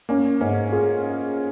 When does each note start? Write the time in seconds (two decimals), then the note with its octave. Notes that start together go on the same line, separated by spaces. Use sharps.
0.09 A#3 C#4
0.41 G#2 C#4
0.73 F4 G#4